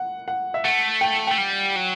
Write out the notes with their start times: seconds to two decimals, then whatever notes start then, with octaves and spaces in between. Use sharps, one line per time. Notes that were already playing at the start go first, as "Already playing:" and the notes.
Already playing: F#5
0.28 F#5
0.54 E5
0.65 A3 F#5
1.01 G5
1.27 A3 G5
1.38 G3
1.76 F#3